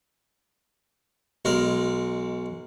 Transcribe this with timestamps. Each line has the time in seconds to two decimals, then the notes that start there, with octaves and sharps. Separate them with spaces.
1.45 B1 G#3 A#4